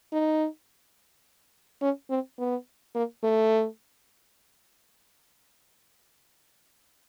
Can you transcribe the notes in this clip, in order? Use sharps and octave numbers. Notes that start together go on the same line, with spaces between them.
D#4
C#4
C4
B3
A#3
A3